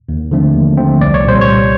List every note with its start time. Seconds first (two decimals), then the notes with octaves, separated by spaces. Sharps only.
0.09 D#2
0.31 D3 F3 A3 C4
0.55 D#2
0.78 D3 F3 A3 C4
1.01 C2 D5
1.14 C#5
1.24 A#2 G3 C5
1.41 C#5
1.48 C2